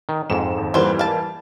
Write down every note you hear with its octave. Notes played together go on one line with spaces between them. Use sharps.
D#3
F2 G#2 E7
D#2
E3 G3 A#3 B3 C5
F5 A5